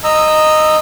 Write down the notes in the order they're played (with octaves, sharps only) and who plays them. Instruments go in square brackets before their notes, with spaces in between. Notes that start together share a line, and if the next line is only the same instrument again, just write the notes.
[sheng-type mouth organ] D#5 A#5 E6